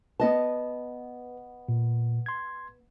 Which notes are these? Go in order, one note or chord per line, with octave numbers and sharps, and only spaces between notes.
B3 B4 D#5 A5
A#2
C6 G#6